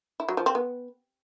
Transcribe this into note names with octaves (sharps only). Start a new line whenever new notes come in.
E4
F#3
F3
C4
B3